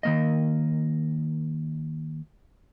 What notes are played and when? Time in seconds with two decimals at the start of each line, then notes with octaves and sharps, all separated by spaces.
0.03 D#3 A#3 D#5